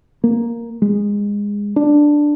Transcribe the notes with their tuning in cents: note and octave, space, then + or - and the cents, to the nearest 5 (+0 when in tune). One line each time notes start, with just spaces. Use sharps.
A#3 +0
G#3 -20
D4 +5